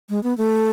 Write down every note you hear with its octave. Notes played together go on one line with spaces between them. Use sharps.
G#3
B3
A3